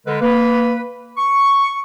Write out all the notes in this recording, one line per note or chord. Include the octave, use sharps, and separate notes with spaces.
D3 G#3 A#4 B4
A#3 B4
C#6